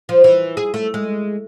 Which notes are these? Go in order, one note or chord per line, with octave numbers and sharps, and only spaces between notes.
F3
E3
G#4
A3
G#3